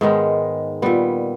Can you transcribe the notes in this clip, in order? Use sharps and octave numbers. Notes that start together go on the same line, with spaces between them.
G#2 D#3 G#3 B3
A#2 G3 B3